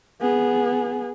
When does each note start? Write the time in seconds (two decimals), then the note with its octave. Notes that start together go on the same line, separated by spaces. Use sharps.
0.21 B3 G#4